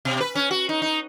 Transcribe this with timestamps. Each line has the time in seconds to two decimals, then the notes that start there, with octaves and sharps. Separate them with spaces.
0.05 B2
0.20 B4
0.35 C#4
0.51 F#4
0.69 D#4
0.82 D#4